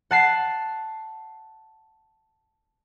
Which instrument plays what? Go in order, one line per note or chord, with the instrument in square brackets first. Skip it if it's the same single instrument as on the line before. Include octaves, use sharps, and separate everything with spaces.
[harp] F#5 A5 C7